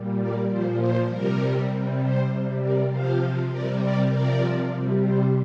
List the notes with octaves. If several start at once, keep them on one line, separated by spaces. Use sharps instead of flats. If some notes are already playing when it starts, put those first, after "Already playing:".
Already playing: A#2 G3
A#4 D5
A#2 F3 C5
C5
C3 G3 A#4
C3 G3
C5
C3 G3
A#4 D5
C3 F3 C5 F5
C3 G3 A#4 D5
A#4 D5
C3 F3 A#4 D5
C3 G3
C5